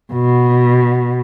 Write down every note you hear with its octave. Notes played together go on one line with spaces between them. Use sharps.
B2